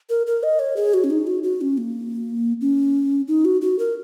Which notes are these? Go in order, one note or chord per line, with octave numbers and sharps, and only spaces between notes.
A#4
A#4
D#5
C#5
G#4
F#4
C#4
D#4
F#4
F#4
C#4
A#3
C#4
D#4
F#4
F#4
A#4